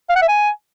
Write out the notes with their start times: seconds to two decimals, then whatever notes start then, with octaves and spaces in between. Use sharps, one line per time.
0.09 F5
0.16 F#5
0.22 E5
0.28 G#5